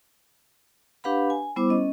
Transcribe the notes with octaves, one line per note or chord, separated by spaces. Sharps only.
D4 G4 B4 F5 F#5 B5
G#5
G3 B3 E4 C5 D6
C#4 D#5